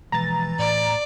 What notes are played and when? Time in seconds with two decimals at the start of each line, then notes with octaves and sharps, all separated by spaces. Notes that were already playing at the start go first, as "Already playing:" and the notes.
0.12 B2 E3 F3 G#3 A#5 A6
0.59 A2 D5